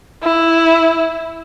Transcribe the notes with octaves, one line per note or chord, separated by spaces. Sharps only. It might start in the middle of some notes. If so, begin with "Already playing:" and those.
E4